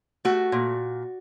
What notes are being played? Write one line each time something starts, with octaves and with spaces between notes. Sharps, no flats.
A3 F#4
A#2